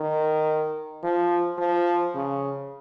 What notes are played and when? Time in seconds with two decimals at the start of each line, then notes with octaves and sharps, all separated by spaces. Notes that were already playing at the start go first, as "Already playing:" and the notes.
Already playing: D#3
1.04 F3
1.58 F3
2.15 C#3